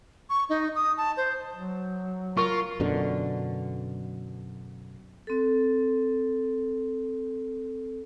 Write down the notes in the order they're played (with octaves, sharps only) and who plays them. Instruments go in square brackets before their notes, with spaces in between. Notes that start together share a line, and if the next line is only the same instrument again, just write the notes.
[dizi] C#6
D#4
D#6
A5
C5
[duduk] F#3
[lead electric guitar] F4 [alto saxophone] A#4 [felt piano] C#6
[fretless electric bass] F#2 B2 D3
[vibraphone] C4 A4